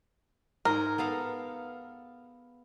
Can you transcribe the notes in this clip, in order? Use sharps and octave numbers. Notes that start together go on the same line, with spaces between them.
G#2 A#4 C6
B3 A4 F5